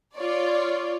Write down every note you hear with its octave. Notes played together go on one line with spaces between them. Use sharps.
F4 C#5 D5